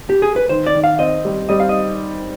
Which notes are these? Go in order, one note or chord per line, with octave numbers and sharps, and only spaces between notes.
G4
G#4
B4
D#3 C5
D5
D#3
F5
C4 D#5
G3
G3 D#5
F5
D#5